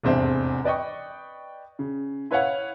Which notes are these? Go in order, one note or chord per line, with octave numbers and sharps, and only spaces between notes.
F1 E2 G#2 C4 D4 E5
B4 D5 D#5 G5 C#6
C#3
E4 B4 C#5 F5 F#5